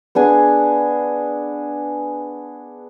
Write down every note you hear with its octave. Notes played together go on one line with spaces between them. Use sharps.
B3 D4 G#4 G#5